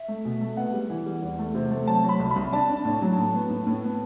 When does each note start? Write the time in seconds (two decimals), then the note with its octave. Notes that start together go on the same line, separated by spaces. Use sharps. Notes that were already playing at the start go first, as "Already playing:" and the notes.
Already playing: E5
0.08 A3
0.25 B2
0.41 A3
0.57 B3 F#5
0.74 G3
0.90 E3
1.06 G3
1.22 E2
1.39 A3
1.55 C3
1.70 A3
1.87 F#3 A5
2.04 F#3
2.09 B5
2.19 C2
2.31 B5
2.36 C2
2.53 D4 A5
2.69 D4
2.85 A2
3.02 F#3
3.18 A2
3.34 B3
3.50 A2
3.66 A2
3.83 B3